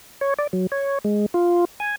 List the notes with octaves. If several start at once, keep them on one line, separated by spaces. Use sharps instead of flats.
C#5
D5
F#3
C#5
G#3
F4
G#5